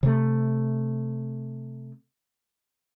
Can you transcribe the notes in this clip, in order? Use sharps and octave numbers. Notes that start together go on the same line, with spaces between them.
C3 A3